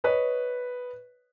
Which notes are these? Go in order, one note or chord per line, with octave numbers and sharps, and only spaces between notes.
B4 C#5 D#5